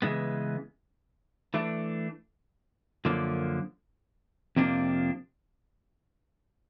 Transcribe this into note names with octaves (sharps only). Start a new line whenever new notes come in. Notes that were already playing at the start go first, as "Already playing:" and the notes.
C#3 E3 G#3 B3
E3 A3 D4
F#2 D3 F3 A#3
F2 C3 F3 A#3 D4